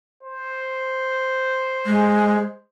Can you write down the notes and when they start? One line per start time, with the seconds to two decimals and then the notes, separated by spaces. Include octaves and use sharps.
0.23 C5
1.86 G#3